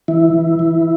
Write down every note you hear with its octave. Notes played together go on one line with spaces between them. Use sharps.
E3 E4
E3
E3